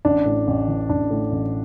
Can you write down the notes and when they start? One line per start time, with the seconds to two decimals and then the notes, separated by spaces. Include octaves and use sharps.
0.05 A1 D4
0.26 A2
0.47 A1
0.68 E3
0.89 A1 D4
1.11 A2
1.32 A1